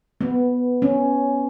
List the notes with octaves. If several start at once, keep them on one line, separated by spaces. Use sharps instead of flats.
B3
C#4